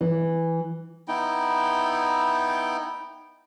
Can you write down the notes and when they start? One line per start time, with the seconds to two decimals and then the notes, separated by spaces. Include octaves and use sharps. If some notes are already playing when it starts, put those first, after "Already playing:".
0.01 E3
1.08 B3 D#4 E4 G5